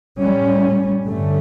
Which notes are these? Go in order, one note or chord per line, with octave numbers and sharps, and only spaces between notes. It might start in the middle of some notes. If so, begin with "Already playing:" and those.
A2 G3 C#4
G2 D3 A3 C#4